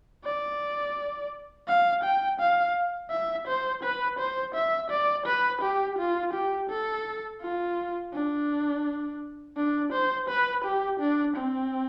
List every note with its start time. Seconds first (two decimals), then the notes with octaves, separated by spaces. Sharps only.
0.25 D5
1.69 F5
2.04 G5
2.40 F5
3.11 E5
3.48 C5
3.83 B4
4.19 C5
4.55 E5
4.91 D5
5.27 B4
5.62 G4
5.99 F4
6.34 G4
6.70 A4
7.42 F4
8.14 D4
9.57 D4
9.93 C5
10.29 B4
10.65 G4
11.00 D4
11.36 C4